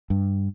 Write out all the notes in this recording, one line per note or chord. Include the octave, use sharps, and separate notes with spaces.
G2